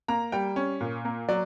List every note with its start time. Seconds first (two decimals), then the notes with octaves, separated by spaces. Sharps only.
0.08 A#3 A#5
0.32 G3 G5
0.56 C#4
0.81 A#2
1.05 A#3
1.29 F#3 D5